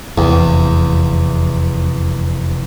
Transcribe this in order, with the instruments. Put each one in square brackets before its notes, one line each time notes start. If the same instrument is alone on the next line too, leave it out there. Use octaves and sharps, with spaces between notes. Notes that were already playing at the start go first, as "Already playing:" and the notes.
[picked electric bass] F1 [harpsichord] E2